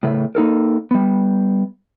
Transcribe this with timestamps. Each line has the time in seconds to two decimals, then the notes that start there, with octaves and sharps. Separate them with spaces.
0.03 A2 C#3 A3
0.35 A#3 D#4 A4 A#4
0.91 G3 B3